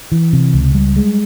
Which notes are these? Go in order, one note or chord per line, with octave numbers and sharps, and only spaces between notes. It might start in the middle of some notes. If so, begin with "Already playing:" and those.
E3
C3
C#2
G3
G#3